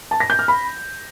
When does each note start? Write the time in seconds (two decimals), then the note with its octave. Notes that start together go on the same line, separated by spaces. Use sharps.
0.11 A5
0.20 A#6
0.30 G6
0.39 F6
0.48 B5